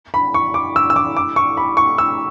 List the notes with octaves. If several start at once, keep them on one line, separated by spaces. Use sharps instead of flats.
B5
C#6
D6
E6
E6
D6
D6
C#6
B5
C#6
E6